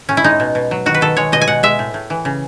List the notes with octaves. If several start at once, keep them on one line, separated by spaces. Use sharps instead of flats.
A2 C#4
E4
G#3 D#4
B2
B2
F#3
D#3 F#4
B4
D#3 A4
G#3 C#5
B2 D#5
G#5
B2 F#5
G#3 E5
A2
A2
E3
C#3